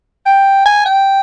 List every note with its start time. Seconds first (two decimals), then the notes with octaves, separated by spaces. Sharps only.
0.26 G5
0.66 G#5
0.86 G5